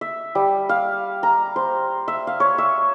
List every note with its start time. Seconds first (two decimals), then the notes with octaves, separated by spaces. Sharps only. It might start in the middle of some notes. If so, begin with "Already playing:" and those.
0.01 E5
0.35 G3
0.69 F5
1.23 A#5
1.56 C5
2.08 E5
2.27 F5
2.40 C#5
2.58 E5